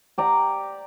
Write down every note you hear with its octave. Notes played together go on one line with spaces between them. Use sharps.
G4 D5 A#5